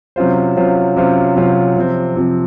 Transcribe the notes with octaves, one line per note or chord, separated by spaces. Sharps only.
C3 F#3 C#4 F4 C5
C3 F#3 C#4 F4 C5
C3 F#3 C#4 F4 C5
C3 F#3 C#4 F4 C5
C3 F3 C4
C3 F3 C4